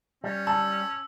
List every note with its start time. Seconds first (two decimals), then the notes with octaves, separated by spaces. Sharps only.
0.24 G3 C#4
0.47 A5 E6